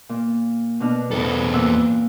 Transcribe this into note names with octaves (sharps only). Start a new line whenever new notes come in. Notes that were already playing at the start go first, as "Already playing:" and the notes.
A#2
B2 D4 F6
E2 A4
A#2 F#5 E6